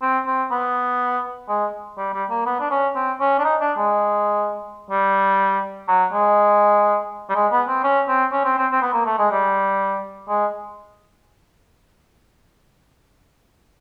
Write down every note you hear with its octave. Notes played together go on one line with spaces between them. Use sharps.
C4
C4
B3
G#3
G3
G3
A#3
B3
D4
C#4
C4
C#4
D4
D#4
D4
G#3
G3
F#3
G#3
G3
G#3
B3
C4
C#4
C4
C#4
C4
C4
C4
B3
A#3
A3
G#3
G3
G#3